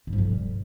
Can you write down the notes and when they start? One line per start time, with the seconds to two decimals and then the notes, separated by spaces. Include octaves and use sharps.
0.07 G2
0.13 F3
0.18 D3
0.23 G#2
0.29 G3